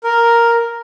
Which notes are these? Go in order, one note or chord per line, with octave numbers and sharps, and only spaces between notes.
A#4